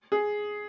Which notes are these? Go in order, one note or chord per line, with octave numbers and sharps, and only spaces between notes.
G#4